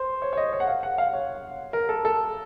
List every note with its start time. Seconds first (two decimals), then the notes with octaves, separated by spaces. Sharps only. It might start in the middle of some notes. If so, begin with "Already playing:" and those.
Already playing: C5
0.22 C#5
0.33 C#5
0.37 D#5
0.53 C#5
0.60 F#5
0.67 F5
0.83 F#5
0.98 F5
1.14 C#5
1.73 A#4
1.89 A4
2.05 A4